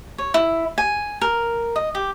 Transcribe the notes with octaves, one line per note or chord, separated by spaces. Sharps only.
C#5
E4
G#5
A#4
D#5
G4